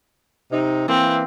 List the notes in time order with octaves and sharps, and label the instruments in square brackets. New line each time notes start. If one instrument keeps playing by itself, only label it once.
[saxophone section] C3 D#4
[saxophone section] E3 A#3 [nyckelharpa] C4